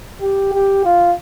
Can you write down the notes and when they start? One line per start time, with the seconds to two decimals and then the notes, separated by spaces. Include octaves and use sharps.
0.21 G4
0.53 G4
0.85 F4